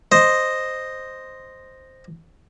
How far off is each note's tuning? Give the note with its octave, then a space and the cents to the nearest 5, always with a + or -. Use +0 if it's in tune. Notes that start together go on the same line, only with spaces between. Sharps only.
C5 +0 D#5 -5